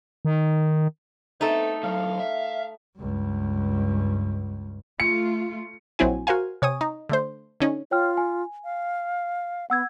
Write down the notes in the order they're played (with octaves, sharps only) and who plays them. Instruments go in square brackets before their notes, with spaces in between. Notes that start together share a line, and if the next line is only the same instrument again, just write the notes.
[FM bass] D#3
[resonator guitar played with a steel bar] A3 D#4 [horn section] B3 C4 A4
[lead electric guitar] A2 F#3 [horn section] F5
[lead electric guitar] E5
[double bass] C#2 G2
[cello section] A3 F4 [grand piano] C#7
[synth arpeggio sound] A#1 F#3 C4 E4 G#5
F#4 A#4 C5 F5 G#5
C3 C#5 G#5 D#6
D#4
D3 A3 C5
D3 C#4 D#4
[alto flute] F4 [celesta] C#5 G5 F6
[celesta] G#5
[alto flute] F5
[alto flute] B3 [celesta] F#5 E6 G#6